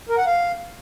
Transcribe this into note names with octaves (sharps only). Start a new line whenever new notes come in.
A#4
F#5
F5